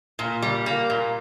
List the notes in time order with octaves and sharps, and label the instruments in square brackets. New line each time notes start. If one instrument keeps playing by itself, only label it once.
[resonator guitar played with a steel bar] A#2
G3
A#3
A#2